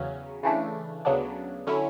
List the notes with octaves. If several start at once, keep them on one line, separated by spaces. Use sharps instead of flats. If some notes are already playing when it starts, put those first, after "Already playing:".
Already playing: E2 C#3 F#3 C#4
C#3 E3 A3 D4
D2 C#3 F#3 B3 D4
D3 F#3 C#4 E4